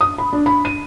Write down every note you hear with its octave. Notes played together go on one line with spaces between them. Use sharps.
D#6
B5
D4
B5
D#7